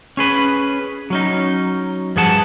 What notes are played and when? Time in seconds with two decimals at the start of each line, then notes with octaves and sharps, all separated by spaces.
0.17 C#4 G#4 B4
1.10 F#3 C#4 D#4
2.16 G2 F3 G#4 F#5 A5